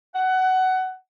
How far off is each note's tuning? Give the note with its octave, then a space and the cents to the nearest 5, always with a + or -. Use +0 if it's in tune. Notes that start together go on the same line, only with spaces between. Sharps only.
F#5 +15